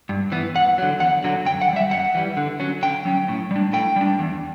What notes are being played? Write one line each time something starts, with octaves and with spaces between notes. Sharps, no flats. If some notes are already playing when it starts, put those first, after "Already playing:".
G2
E3 B3
E2 F#5
D3 F#3
E2 F#5
D3 F#3
F#2 G5
F#5
E3
G3 E5
F#2 F#5
E3 G3
D3
F#3 C#4
D3 G5
F#3 C#4
A2
G3 D4
A2 G5
G3 D4
E2